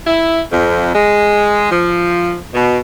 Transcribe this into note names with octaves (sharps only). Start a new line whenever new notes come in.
E4
F2
G#3
F3
B2